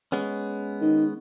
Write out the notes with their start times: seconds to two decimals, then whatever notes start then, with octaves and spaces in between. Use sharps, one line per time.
0.12 G#3 B3 C#4
0.81 D#3